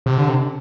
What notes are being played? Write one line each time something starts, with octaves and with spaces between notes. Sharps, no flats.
C3
D3
C3